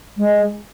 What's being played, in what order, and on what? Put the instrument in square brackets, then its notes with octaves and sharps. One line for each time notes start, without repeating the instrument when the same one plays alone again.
[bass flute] G#3